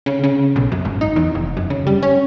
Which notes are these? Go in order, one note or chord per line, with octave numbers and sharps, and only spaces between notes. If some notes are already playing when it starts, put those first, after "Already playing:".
C#3
C#3
B1
F#2
G#1
D#4
E2
F1
F#2
C#3
G3
C#4